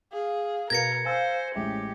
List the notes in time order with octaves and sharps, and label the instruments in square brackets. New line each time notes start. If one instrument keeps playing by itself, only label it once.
[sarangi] G#4 [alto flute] F5
[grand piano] B2 B4 [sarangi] A#4 [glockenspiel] G#6 A#6 C#7
[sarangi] C5 [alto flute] F5 [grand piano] G#5 E6 A6
[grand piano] A1 G#3 E5 [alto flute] C#4 [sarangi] G4